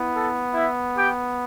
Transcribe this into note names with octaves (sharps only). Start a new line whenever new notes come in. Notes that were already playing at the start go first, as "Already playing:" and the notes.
Already playing: B3 E4
A4
E4 E5
G4 G5